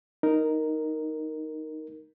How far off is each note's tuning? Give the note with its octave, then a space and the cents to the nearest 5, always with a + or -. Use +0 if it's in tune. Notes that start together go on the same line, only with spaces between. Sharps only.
D#4 +0 A#4 +0